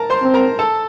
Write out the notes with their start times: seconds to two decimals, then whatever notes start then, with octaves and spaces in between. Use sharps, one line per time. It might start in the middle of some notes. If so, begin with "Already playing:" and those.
Already playing: A#4 A5 A#5
0.10 C5 C6
0.22 C4
0.34 A#4 A#5
0.59 A4 A5